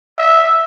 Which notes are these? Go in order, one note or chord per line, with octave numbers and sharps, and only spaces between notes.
E5